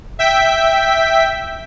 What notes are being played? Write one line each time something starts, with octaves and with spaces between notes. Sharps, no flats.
E5 G5 B6